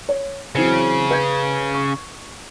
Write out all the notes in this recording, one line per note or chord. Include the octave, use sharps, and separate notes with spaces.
C#5
C#3 E3 F#3 C4
B4 G6 G#6
C#6